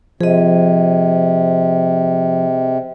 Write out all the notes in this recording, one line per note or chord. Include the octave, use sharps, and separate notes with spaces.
C3 F3 G#4 D#5